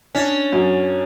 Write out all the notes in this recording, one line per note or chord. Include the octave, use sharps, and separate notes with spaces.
C#4 D4
F#2